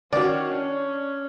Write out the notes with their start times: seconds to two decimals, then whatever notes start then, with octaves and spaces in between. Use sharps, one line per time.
0.13 D#3 C#4 F#4 D5
0.51 C#4 D4